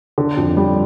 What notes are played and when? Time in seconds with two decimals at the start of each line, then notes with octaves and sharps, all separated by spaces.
0.18 D3
0.37 F2
0.57 G3